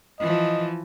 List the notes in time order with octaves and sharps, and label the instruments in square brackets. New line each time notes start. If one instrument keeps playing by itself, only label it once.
[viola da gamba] E3 F3 [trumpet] D#5